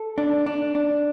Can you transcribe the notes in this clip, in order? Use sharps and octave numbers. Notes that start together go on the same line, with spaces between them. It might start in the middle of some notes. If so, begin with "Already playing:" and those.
Already playing: A4
D4
D4
D4